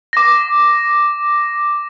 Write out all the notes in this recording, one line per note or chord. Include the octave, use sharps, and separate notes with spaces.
D6 A#6